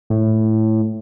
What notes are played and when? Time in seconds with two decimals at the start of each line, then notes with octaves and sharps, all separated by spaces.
0.10 A2